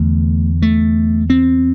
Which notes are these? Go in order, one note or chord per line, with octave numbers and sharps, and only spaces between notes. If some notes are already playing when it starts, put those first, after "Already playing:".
Already playing: E2 D3 A3
A3
C4